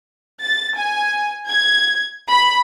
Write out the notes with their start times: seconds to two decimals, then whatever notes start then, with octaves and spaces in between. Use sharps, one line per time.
0.41 A6
0.75 G#5
1.46 G#6
2.30 B5